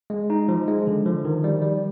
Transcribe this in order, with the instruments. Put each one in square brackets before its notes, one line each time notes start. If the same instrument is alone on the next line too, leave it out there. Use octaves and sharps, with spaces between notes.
[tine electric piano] G#3
D#4
F3
G#3
D3
F3
D#3
G3
G3